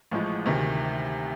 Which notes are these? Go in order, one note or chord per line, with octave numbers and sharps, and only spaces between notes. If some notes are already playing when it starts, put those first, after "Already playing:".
A1 A2 F3 G#3
D2 C3 D#3